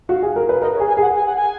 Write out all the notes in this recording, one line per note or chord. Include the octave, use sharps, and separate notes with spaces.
F#4 F5
G#4
A#4
B4
A#4 D#5
C#5
G#4
G#5
G#4
F#5
G#5
F#5
G#5